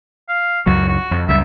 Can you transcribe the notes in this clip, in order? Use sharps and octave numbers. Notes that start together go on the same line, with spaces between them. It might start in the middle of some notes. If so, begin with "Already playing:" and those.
F5
C#2 F#2 F#3 F#4
F#4
F2
C#2 F#2 G3 E5